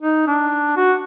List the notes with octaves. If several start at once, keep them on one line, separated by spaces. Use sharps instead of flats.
D#4
D4
F#4